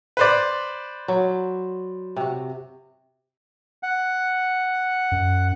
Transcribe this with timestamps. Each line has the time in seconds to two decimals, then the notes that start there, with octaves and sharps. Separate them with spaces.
0.17 B4 C5 D5
1.08 F#3
2.16 C3 F#4
3.83 F#5
5.12 F#2